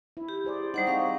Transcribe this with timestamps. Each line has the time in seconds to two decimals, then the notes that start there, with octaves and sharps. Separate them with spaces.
0.17 E4
0.29 G4
0.45 G#4 C5 D5
0.74 G3 D#4 C5 D#5 F#5
0.87 C4 G#4 F5 C#6